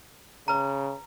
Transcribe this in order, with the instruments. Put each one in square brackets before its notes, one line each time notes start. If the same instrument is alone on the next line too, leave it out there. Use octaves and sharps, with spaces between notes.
[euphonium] C#3 [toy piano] B4 A#5